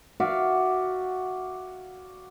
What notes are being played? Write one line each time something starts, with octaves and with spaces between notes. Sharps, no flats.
F#4 D5 E5 F5